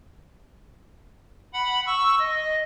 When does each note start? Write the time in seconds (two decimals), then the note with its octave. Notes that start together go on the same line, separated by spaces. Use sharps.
1.53 F#5 B5
1.87 C#6 E6
2.19 D#5